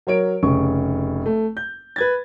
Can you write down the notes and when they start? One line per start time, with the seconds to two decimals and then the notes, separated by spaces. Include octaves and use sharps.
0.07 F#3 A#4 C#5 D7
0.43 F1 C#3 C#6
1.26 A3
1.57 G6
1.96 B4 G#6 A6